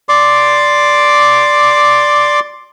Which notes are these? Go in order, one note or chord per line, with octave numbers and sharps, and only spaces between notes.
D5 C6 D6